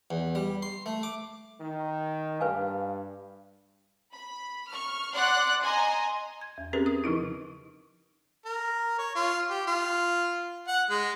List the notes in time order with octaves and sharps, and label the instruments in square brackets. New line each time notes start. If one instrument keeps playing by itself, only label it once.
[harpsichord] E2
G3
C6
A3
D6
[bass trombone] D#3
[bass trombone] G2 [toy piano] B4 F5 G#5
[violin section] B5
C#6 F6
D5 F#5 C6 F#6
D#5 G#5 A#5 C6
[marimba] G#6
E2
C4 C#4 G4 G#4 A#4 B4
D#6
C#3 F3 D#4 E4
[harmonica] A#4
C#5
F4
G4
F4
F#5
G#3